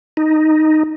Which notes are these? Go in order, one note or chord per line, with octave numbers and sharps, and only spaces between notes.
D#4